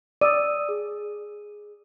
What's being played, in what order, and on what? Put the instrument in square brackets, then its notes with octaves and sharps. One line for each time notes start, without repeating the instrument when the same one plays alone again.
[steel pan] D5 [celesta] D#6 E6 D#7
[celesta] G#4